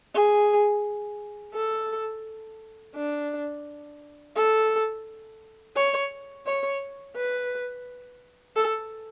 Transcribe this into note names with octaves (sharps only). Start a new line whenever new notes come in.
G#4
A4
D4
A4
C#5
C#5
B4
A4